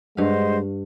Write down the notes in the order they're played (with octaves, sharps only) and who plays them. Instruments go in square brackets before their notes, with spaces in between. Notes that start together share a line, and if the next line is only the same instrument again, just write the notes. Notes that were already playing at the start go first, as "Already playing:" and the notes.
[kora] G2 F5 [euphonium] G#3 [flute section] C5 D#5 F#5